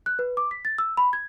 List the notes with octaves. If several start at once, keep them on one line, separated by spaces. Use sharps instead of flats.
F#6
B4
D6
B6
A6
E6
B5
G#6